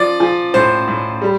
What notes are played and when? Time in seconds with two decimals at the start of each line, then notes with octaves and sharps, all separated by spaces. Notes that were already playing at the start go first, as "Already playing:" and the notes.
Already playing: F3 D5
0.20 F3
0.54 A2 C5
0.88 A2
1.22 G3